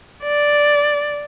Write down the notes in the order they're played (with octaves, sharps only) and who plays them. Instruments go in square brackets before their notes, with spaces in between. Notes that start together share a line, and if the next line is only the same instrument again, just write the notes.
[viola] D5